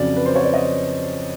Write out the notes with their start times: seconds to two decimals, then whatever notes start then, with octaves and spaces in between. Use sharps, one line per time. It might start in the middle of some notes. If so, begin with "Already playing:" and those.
Already playing: F2 C#3 F#3 D5
0.16 B4
0.26 C5
0.36 C#5
0.44 D5
0.54 D#5